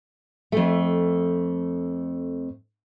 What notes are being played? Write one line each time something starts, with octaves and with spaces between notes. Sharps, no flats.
F2 A3